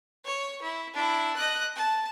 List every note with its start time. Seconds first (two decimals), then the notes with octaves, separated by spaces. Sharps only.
0.25 C#5
0.62 E4
0.94 D4 E4
1.36 D#5 F#6
1.76 A5